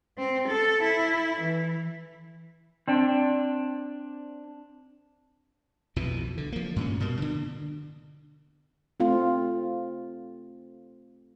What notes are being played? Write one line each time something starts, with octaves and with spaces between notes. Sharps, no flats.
C4
A4
E4
E3
C4 D4 D5 G5
B1 F2 B2 E3
D3
F3 A#3
G2 A#2 C#4
B2 A#3
D3
A3 C4 F4